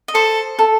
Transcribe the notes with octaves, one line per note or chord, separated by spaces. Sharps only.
D#5
A4 C5
A4